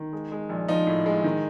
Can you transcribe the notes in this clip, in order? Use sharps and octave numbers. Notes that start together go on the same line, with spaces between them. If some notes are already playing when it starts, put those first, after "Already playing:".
Already playing: D#3
G#3
G#3
A#1
F3 D#4
A2
G#3
D#3